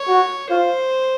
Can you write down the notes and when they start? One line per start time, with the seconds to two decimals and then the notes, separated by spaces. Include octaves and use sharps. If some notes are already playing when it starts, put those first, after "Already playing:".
Already playing: C#5
0.08 F#4
0.50 F4 C5